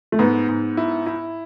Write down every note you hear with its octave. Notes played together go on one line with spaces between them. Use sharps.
A3
G#2 B3
G#2
E4
E4